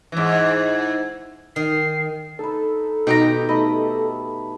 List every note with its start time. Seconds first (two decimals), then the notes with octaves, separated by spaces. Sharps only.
0.12 G#2 E3
1.56 D#3 C7
2.39 D#4 A4 B4
3.07 B2 D#3 D#4 G4 D#5 G5 A#5
3.49 A3 D#5 B5